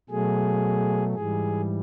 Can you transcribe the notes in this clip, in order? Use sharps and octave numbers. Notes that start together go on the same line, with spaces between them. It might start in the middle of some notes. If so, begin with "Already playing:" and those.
B2 F#3 A3 G#4
G#2 E3 G3 G#4